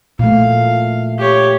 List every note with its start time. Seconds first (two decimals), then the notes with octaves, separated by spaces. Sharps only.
0.19 A#2 A3 F5
1.18 G4 C#5